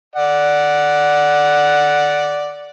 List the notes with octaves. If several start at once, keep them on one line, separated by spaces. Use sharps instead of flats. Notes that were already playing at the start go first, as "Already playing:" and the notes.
D5 F#5